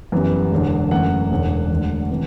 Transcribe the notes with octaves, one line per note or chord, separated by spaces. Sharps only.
F#2 E3 G3 B3
E1 E2 D3
F#2 E3 A3 F#5
E1 E2 D3
E1 D2 D3
C3 E3